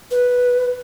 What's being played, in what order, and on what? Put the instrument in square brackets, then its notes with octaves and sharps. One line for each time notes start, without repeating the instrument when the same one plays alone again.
[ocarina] B4